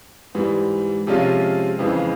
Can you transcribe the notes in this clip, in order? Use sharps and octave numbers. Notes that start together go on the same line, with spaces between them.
G#2 E3 G3
C3 F3 G#3 C#4 F4
F2 C#3 E3 G#3